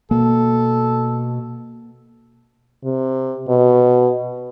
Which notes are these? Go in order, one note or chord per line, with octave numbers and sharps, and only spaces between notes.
B2 A#3 A4
C3
B2